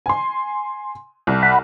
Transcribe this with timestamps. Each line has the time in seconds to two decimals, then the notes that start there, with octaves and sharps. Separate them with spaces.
0.06 G#5 C6
1.27 C2
1.43 F#5 B5